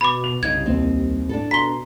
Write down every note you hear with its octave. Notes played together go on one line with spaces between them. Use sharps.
B2 B5 D6
F7
C2 C#3 D#4 G#6
D#2 C4 D#4
A2 D4 A4
B2 A#5 C6 B6 G7